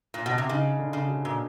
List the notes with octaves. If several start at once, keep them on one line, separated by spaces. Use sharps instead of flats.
A#2
B2
C3
C#3 D#4
D3
C#3
F#3
A#2